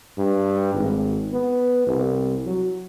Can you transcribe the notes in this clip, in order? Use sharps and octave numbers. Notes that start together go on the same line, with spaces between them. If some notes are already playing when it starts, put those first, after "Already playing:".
G2
G#1
B3
C2
F#3